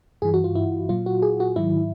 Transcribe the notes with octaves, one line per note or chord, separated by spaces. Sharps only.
G2 E3 G#4
F#4
F4
E4
A#2 F#3 F4
F#4
G#4
F#4
G#2 D#3 F#3 E4